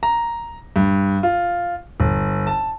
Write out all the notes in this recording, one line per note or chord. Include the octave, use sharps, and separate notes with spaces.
A#5
G2
F4
G1
A5